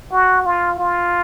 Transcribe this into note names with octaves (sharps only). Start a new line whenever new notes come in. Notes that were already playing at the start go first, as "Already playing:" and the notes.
F#4
F4
F4